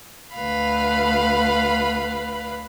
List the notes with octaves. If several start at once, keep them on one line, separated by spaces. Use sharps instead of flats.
D2 B4 F5 B5